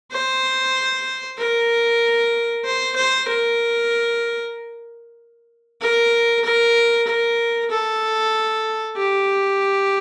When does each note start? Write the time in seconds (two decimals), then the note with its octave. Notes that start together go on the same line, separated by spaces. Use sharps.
0.12 C5
1.38 A#4
2.64 C5
2.96 C5
3.28 A#4
5.81 A#4
6.44 A#4
7.07 A#4
7.71 A4
8.97 G4